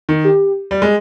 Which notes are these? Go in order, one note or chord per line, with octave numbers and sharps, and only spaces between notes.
D#3
G4
G3
G#3